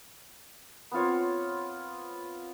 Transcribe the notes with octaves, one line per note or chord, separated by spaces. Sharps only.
B3 C4 F4 C#5